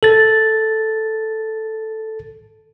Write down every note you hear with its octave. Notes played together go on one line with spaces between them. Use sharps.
A4 A6